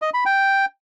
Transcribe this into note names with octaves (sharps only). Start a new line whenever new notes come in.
D#5
B5
G5